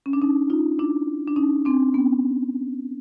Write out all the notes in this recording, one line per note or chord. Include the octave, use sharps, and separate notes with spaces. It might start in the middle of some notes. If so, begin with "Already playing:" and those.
C#4
D4
C#4 D#4
D#4 F4
D4 E4
D4
C#4 D#4
C4 D4
B3 C#4